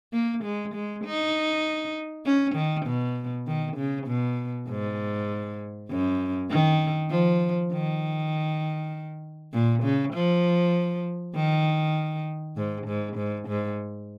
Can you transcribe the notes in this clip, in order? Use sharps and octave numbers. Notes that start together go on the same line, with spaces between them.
A#3
G#3
G#3
D#4
C#4
D#3
B2
D#3
C#3
B2
G#2
F#2
D#3
F3
D#3
A#2
C#3
F3
D#3
G#2
G#2
G#2
G#2